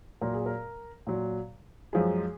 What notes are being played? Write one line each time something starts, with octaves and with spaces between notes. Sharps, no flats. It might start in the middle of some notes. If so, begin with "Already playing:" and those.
A#2 F#3 A#4
G#4
A#4
A#2 F#3
F#2 F3 G#3 G#4